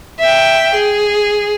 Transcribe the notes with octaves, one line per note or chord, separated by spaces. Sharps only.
E5 G5
G#4